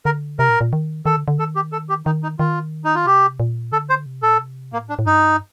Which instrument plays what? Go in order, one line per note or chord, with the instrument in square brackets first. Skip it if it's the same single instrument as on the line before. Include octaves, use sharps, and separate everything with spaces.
[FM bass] D3 [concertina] A#4
[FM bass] C3 [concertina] A#4
[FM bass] A#2
A#2
D#3
[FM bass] D#3 [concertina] A4
[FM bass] D3
D3
[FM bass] D#3 [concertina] A4
[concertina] G4
A4
G4
[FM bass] D#3 [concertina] D#4
[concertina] D#4
[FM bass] D#3 [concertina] F4
[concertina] D#4
F4
[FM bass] C3 [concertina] G4
[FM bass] A#2
[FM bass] D3 [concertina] A4
[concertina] C5
[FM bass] C3
[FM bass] A#2 [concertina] A4
[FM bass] C3
[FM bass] A2 [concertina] A#3
[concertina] D4
[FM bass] A2
[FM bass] G2 [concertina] D#4